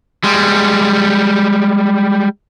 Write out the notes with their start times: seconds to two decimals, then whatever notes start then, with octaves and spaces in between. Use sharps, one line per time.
0.24 G3 G#3